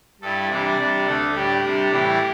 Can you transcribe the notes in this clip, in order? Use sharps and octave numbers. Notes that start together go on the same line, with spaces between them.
G2 G3 E4 A4
C3 E3 G3 D4 D5
C3 G3 D4
D2 D3 A3 D4 A4
A2 G3 D4 G4
C3 G3 D4
A2 E3 G3 E4